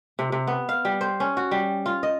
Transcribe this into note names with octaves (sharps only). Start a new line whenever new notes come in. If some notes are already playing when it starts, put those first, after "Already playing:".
C3
C3
B3
F5
G3
C5
C#4
F#4
G3
F4
D#5